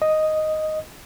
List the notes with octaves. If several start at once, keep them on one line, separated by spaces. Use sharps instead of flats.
D#5